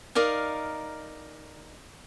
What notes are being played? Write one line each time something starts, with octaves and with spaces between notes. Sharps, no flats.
D#4 A#4 D5 F5